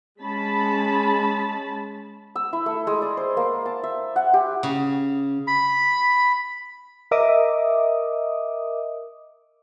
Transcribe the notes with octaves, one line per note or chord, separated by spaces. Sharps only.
G#3 C#4 A5 B5
E6
E4
A3
G#3
D5
C5
A#3
A5
E5
F#5
G4
C#3
B5
A#4 D#5 E5 D6 D#6